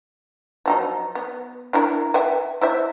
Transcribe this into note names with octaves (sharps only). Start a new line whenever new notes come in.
F3 F#3 D#4
B3
D4 E4 A#4
B4 E5 G5
E4 C5 E5